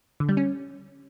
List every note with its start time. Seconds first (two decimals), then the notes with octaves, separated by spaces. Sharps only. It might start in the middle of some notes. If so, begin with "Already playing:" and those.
0.20 D3
0.29 G3
0.37 C#4